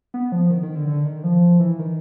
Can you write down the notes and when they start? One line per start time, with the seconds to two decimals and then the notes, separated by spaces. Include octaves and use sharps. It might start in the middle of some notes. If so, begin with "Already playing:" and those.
0.14 B3
0.32 F3
0.50 D#3
0.63 D#3
0.75 D3
0.87 D3
1.05 D#3
1.24 F3
1.60 E3
1.79 D#3